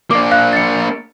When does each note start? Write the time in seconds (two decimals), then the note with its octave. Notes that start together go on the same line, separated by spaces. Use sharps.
0.11 A#3 D4 D6
0.31 F5 F#6
0.53 A6 C#7